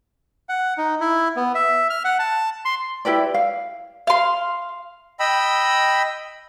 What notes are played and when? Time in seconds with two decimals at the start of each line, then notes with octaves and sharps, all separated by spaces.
0.49 F#5
0.78 D#4
1.00 E4
1.36 B3
1.55 E5
1.90 F6
2.05 F#5
2.19 A5
2.65 C6
3.05 E4 G4 B4 D5
3.34 F5
4.07 F5 C6
5.20 D#5 G5 B5 E6